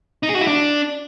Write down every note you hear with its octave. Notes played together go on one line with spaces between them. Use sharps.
D#4
G#4
F#4
E4
D4